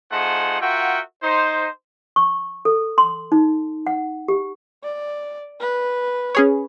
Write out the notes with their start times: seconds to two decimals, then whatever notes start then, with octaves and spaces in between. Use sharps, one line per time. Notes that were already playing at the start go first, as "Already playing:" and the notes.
0.12 A3 D#4 F4 G#4 C5 F#5
0.61 F4 F#4 A#4 E5 F#5 G5
1.23 D#4 C5
2.16 C#6
2.65 A4
2.98 C6
3.32 D#4
3.87 F#5
4.28 G4
4.84 D5
5.60 B4
6.35 C#4 G#4 C#5